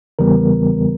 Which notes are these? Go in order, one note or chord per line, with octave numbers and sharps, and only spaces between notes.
E2 C#3 E3 G3 B3 A#4